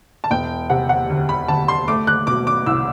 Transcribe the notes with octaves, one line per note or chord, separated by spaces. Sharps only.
A5
E1 G5
C3 F#5
F#5
D2
B5
D2 A5
C6
A3 D6
F#6
B2 D6
D6
C2 E6